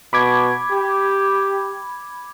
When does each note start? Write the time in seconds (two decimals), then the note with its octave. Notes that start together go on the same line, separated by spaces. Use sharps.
0.13 B2 B5 D6 G#6
0.71 G4